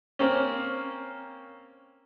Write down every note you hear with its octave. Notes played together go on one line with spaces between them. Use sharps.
A#3 C4 C#4